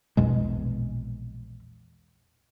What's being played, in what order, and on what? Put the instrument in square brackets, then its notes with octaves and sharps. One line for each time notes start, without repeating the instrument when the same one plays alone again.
[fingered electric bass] A#1 E2 B2 G#3